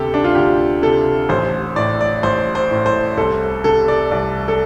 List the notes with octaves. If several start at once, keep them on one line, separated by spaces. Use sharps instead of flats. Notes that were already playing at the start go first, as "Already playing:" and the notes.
Already playing: D2 C3 G4 A4
D4
F4
D2 G4
C3 A4
A1 C5
A2 D5
D5
A1 C5
C5
A2
C5
C2 A4
C3 A4
D5
C2 D5
A4